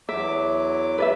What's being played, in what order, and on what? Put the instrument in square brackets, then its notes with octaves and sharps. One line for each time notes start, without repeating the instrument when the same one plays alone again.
[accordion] E2 F#3 D6 [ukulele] E5
[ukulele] B4 D5 E5